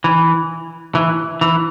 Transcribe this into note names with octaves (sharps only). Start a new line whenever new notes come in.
E3
E3
E3